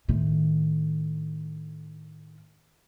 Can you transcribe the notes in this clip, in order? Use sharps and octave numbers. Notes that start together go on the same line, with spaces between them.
A2 D#3